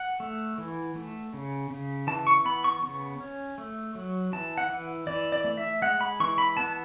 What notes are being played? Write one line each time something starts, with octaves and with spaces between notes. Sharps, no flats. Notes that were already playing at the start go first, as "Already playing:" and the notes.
Already playing: F#5
A3
E3
A3
C#3
C#3
E3 A5
C#6
B3 B5
C#6
C#3 C#6
C#4
A3
F#3
E3 A5
F#5
E3
E3 D5
D5
A3
E5
G#3 F#5
B5
E3 C#6
B5
B3 A5